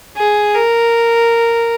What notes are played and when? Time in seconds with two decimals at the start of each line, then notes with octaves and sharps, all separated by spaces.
0.16 G#4
0.54 A#4